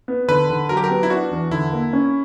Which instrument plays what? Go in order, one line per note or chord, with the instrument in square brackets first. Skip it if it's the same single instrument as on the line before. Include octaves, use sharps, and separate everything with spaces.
[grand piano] B3
[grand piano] D3 [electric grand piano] B4
[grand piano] D3
[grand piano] F#3 [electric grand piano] A#4
[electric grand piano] G4
A#4
[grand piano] B3
[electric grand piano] E4
[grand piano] D4 [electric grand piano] F#4
[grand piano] E2
[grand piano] D3 [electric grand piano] E4
[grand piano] A#3
C#4